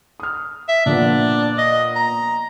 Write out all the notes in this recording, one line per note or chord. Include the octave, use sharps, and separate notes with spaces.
D#6 F6
E5
A#2 F3 B3 D4
D#5
A#5